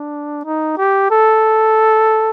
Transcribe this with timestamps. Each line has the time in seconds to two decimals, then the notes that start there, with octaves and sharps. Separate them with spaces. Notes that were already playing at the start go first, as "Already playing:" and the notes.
Already playing: D4
0.45 D#4
0.77 G4
1.11 A4